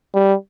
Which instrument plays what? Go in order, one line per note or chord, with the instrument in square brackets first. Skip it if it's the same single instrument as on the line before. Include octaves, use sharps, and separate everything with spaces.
[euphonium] G3